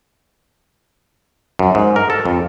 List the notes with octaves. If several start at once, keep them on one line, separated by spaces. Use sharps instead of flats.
F#2
G#2
A#4
A4
F2